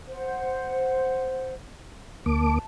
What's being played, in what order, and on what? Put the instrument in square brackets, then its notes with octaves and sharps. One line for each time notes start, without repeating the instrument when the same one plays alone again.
[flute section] C5 F#5
[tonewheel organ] D2 A#3 D6 [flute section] A5